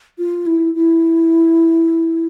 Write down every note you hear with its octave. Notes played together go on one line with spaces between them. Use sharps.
F4
E4
E4